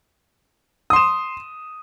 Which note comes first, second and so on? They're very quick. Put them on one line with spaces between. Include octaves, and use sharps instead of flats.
D#6 C6 E7